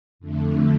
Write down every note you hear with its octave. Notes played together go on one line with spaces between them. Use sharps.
F2 D3 A3